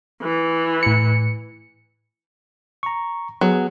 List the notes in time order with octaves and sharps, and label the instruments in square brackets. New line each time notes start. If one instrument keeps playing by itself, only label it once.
[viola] E3
[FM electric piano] A2 C#7
[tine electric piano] A#5 C#6
[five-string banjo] F#3 [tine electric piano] B3 G#4